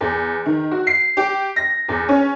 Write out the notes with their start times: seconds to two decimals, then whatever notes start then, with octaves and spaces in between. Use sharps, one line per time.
0.01 E2
0.46 D#3
0.71 F#4
0.87 C7
1.17 G4
1.56 A#6
1.88 E2
2.09 C#4